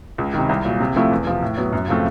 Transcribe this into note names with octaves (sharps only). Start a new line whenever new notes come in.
C#2
C3 D#3
C2
A#2 F#3
C3
F3 A3 C4 E4
E2
C3 F3
A2
F#3 B3
F#2
C#3 F3 A3 C4